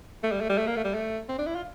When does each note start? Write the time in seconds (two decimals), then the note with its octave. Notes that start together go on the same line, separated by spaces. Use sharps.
0.23 A3
0.31 G3
0.41 A3
0.49 G3
0.58 A3
0.67 A#3
0.76 A3
0.84 G3
0.94 A3
1.29 C4
1.38 D4
1.46 E4
1.55 F4